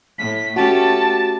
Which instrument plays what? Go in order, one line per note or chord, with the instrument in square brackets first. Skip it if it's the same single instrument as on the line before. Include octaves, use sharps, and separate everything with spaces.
[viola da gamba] A2 [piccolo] B6
[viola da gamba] A3 C#4 G4 [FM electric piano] F#4 [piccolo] A5